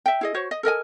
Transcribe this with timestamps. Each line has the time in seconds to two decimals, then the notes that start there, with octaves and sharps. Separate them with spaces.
0.06 E5 G5
0.21 E4 G#4 D#5
0.34 F#4 C5 C#5
0.51 D#5
0.63 A4 A#4 D#5 G#5